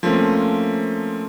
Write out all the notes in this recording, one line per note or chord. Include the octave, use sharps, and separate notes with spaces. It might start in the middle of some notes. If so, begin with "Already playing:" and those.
F3 A3 A#3 C4 C#4 F4